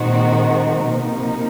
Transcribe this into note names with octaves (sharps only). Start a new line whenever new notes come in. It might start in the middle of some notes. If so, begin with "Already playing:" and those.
Already playing: A#2 D#3 G#3 C4 D#4 F#4
B2 F3 A#3 D#4
C3